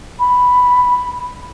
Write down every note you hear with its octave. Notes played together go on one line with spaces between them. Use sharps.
B5